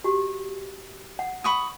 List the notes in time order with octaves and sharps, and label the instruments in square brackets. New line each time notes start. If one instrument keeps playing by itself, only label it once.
[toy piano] F#4 G4
F#5
[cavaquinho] B5 C#6 D#6